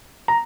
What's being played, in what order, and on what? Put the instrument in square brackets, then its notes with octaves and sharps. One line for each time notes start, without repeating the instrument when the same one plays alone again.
[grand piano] A#5